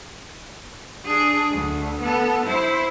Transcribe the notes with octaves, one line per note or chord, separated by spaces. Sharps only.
D4 G#4
D2
B3 A4
E4 C5